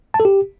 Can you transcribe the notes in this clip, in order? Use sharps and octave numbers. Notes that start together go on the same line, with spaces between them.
A5
A4
G4